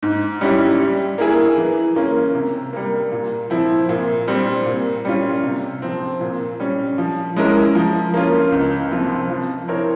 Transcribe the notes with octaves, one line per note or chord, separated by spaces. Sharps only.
G#2
G3 C#4 E4 G4
G3
A#3 E4 G#4
E3
A#3 C#4 F4
C3
G3 A#3
A#2
F3 C4 E4
A#2
G3 C4
A#2
G3 C#4 F4
C3
F3 C4
A#2
G3 C#4
F3
G#3 C#4 E4 A#4
F3
A#3 C#4 F4
C#2
C3 F3 C4 F4
F3
C4 E4 A#4 C#5